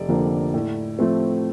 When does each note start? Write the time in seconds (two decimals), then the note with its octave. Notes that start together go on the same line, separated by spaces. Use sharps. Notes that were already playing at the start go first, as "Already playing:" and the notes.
Already playing: F1 D5
0.08 F2 D3 F3 A#3
0.54 A2
0.99 F3 A3 C4